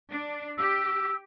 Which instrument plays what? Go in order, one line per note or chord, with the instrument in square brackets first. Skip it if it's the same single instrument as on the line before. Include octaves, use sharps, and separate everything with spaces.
[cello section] D4
[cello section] G4 [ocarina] E6